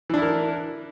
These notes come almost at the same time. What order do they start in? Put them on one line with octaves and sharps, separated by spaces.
E3 D4 E4 A#4